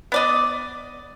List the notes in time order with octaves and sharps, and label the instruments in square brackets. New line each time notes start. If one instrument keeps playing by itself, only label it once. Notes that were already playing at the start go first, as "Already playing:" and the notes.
[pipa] B3 D5 D#5